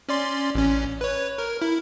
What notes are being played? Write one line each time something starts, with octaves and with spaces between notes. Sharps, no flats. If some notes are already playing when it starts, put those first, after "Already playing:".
C#4 D5 C6
A1 C#4
B4 C#5
A#4
E4